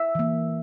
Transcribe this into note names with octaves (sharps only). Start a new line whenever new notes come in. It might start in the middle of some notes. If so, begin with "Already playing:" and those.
Already playing: E5
E3 A#3